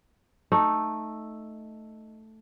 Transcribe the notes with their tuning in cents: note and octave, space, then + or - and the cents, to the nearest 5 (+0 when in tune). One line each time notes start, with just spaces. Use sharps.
A3 +0 D#4 -5